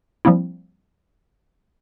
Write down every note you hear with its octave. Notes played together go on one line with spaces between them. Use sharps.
F3 G3 A#3 C4 E4